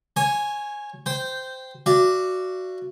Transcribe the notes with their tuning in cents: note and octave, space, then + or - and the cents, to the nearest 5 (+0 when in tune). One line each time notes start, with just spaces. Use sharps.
C#5 -20 G#5 +0
C5 -10 G5 +0
F#4 +0 D5 +0 F5 -45